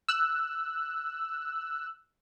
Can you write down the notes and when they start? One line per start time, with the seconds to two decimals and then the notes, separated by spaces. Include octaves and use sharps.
0.08 E6 F#6